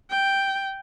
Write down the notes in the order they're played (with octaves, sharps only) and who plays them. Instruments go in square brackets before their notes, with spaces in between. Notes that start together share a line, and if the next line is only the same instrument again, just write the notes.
[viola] G5